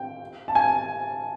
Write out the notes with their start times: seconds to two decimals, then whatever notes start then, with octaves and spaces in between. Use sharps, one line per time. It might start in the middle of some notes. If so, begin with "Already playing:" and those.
Already playing: G5
0.48 A5
0.55 G#5